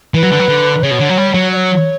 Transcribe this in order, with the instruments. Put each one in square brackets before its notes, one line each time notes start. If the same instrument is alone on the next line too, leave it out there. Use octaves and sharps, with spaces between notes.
[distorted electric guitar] E3 [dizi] B4
[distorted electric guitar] F#3
D3
F#3
D3
[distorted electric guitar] C#3 [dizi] C#5
[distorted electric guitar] B2
D3
F#3
G3
F#3
[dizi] D5
C#5